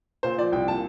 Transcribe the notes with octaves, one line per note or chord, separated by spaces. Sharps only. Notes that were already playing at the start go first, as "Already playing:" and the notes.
A#2 C5
F3 D5
C2 G5
A#2 A5